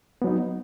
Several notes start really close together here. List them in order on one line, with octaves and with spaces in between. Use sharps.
B3 F#3 D#4